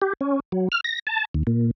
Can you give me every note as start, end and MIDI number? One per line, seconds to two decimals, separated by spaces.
0.02 0.13 67
0.21 0.40 61
0.52 0.68 54
0.72 0.81 89
0.84 0.99 94
1.07 1.25 81
1.34 1.43 39
1.47 1.71 46